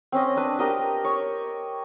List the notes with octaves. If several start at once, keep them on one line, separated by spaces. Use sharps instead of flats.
C4 C#4 D#5
D4 B4
G4 A#4 D#5
C#5